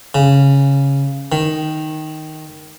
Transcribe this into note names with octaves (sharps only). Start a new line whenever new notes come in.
C#3
D#3